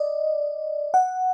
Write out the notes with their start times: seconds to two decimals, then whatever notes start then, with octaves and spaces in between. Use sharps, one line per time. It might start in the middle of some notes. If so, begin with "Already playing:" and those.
Already playing: D5 D#5
0.94 F#5